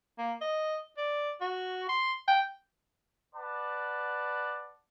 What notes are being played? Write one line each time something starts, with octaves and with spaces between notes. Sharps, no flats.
A#3
D#5
D5
F#4
C6
G5
B4 D5 F#5 A5